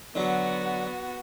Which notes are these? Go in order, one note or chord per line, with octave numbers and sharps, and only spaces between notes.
D3 F#3 B3 F#4